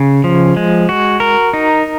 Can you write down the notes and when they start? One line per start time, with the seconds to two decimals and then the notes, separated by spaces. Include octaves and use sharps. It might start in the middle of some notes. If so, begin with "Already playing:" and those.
Already playing: C#3
0.24 F3
0.56 G#3
0.89 F#4
1.20 A#4
1.53 D#4